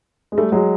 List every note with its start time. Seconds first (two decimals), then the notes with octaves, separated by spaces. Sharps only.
0.32 G#3
0.38 G3 A3
0.52 F#3 G#3